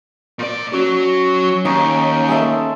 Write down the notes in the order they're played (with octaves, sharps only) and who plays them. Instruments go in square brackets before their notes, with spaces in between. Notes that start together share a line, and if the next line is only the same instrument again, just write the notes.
[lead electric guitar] A#2 D5
[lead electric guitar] F#3 F#4 [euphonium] C#4
[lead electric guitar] D#2 [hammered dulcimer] D#4 G#5 C#6
[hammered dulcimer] G#3 A4 E5